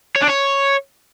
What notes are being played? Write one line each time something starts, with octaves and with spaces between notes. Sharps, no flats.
C#5
D4
C#5